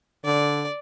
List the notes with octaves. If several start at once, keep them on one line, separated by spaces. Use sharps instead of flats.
D3 D5